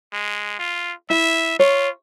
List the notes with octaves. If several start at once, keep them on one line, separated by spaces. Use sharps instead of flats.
G#3
F4
E4 E5
F4 C#5